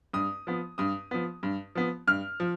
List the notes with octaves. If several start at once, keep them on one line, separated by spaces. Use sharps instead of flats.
G2 D#6
F3 B3
G2 D#6
F3 B3
G2
F3 B3
G2 F6
F3